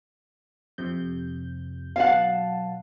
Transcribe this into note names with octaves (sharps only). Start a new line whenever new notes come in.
F2 C3 G6
B2 F#3 F5 F#5 A5